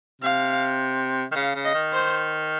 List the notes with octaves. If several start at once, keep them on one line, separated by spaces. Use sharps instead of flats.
C3 F5
D#3
C#3 F5
C#3
D#5
D#3
C5